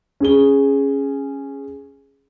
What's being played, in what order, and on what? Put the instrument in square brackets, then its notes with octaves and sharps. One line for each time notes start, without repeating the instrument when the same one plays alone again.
[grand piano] C#4 G#4 G7